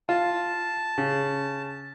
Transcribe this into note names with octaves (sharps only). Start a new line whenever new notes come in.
F4 A5
C#3